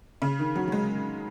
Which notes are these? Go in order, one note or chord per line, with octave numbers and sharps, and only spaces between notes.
C#3
D#3
F#3
F#3
G#3